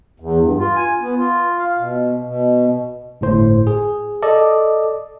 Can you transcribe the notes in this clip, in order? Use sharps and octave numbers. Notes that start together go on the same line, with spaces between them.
E2
G2
F4
G#5
B3
F4
F5
B2
B2
G1 A2 C5
G#4
A4 D5 D#5